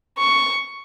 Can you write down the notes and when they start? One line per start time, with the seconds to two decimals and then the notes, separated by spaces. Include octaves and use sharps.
0.19 C#6